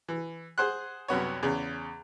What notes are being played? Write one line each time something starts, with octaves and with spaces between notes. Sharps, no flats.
E3
G#4 C5 F#5 C6 F#6
C2 F#2 B3 C#5
E2 C#3